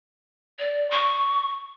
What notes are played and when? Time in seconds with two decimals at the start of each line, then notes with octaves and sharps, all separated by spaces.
0.59 D5
0.90 C#6